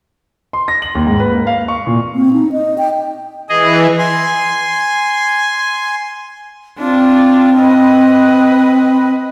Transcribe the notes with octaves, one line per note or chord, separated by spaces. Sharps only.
C6
A#6
F#7
D#2
G#2
B4
A#3
F5
C#6
A#2
C4
D#4
D#5
G5
E3 G#4 D#5
G#5 C6
C4 D4 F4
B4 D#5